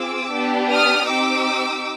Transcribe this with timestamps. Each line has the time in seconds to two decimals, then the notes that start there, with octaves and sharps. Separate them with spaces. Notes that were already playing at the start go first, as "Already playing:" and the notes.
Already playing: C4 F4 G#4 D6 E6
0.33 B3 D4 G4
0.71 D#6 F6
1.09 C4 D#4 G4 D6 E6